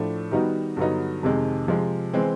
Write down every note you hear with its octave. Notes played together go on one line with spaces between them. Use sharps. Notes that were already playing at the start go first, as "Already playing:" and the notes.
Already playing: A2 F3 A3 D4
D#3 G3 B3 D#4 F#4
G2 D3 F#3 B3 D#4
F2 C3 D#3 G#3
C3 F3 G#3
E3 G#3 C4